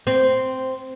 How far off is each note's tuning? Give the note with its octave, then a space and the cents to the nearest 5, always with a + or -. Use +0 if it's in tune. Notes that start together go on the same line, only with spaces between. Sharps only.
C4 -5